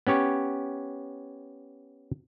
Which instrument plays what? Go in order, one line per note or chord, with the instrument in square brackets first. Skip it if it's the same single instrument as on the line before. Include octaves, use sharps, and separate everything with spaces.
[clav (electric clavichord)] B3 C#4 G4 C#5